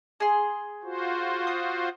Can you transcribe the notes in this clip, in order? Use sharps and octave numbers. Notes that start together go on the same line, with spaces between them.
G#4 C6
F4 F#4 C5
D#6